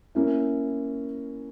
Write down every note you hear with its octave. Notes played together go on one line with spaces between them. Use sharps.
A#3 C#4 E4